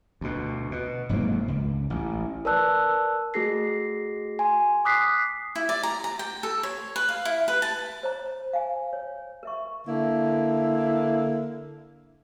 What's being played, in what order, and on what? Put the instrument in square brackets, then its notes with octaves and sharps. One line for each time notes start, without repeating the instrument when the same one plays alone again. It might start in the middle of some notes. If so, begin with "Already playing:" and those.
[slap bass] D2 B2
B2
F1 G#2 F#3 A#3
C#2
A1
[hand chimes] A#4 B4 D5 A5 E6 F#6
A3 F#4 G#4 A#6 C7
G#5 C6
D6 D#6 F#6 B6 C7
[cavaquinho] E4
D5
A#5
A#5
G5
A4
C#5
B4
F5
E4
B4
A5
[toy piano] C5 C#5 A#5
F5 G#5
C#5
A#4 E5 C#6
[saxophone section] D3 A#3 E4